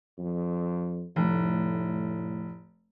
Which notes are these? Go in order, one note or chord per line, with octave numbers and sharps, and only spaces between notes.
F2
F1 A2